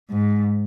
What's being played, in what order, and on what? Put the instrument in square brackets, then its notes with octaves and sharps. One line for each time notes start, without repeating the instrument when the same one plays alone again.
[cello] G#2